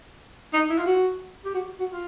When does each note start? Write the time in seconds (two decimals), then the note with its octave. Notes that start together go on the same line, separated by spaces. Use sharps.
0.53 D#4
0.70 E4
0.78 F4
0.86 F#4
1.45 G4
1.54 F#4
1.80 F#4
1.93 F4